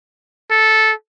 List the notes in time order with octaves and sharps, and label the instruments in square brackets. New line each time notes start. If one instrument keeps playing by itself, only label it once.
[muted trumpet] A4